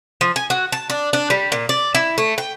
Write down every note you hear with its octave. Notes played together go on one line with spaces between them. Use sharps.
F3
G#5
F#4
A5
D4
D4
G3
A#2
D5
E4
A3
G5